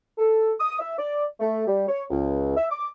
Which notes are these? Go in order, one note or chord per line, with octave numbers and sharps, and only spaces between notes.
A4
D#6
E5
D5
A3
G3
C#5
C#2
E5
D6